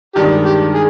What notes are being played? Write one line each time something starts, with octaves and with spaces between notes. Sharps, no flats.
G2 D#3 G#3 D4 G4
G4
G#4